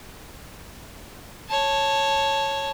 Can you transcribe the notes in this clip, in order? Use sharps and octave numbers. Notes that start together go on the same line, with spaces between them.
C#5 A5